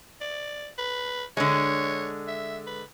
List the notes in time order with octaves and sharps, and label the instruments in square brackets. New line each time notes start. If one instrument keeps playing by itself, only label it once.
[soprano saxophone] D5
B4
[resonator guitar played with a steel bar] D3 G#3 [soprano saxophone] C#5
[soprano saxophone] E5
B4